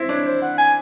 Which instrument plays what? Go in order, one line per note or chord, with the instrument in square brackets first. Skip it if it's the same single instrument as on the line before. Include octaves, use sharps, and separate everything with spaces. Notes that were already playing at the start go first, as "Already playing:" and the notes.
Already playing: [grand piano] C4 E4
[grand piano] D4 [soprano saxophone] C#5
[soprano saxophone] C5
F#5
G#5